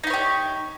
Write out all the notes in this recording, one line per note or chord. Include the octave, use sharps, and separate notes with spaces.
D#4 E4 G4 C#5